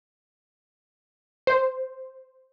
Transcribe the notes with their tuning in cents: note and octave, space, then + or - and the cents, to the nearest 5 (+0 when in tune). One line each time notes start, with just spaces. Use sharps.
C5 +0